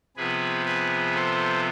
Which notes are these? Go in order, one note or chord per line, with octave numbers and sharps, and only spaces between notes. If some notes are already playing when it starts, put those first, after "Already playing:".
C3 F3 B3 G#4 B4
G#4 B4
A4 C5